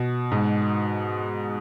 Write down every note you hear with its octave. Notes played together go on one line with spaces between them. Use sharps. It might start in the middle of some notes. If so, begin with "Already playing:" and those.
Already playing: B2
G#2